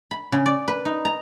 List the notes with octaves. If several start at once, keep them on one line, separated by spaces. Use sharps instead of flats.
B5
C#3
D5
B4
D#4
A#5